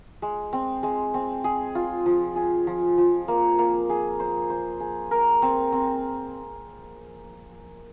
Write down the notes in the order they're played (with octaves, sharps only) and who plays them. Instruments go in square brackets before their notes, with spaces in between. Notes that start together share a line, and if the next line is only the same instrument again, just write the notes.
[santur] G#3
C4
G#3
C4
G#4
F4
F3
G#4
F3
F3
A#3
A#3
G#4
C5
C5
G#4
A#4
C4
C4